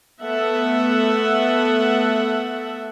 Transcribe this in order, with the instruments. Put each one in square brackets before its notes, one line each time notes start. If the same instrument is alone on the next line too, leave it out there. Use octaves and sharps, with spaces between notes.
[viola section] A3 B3 A4 E5 F#5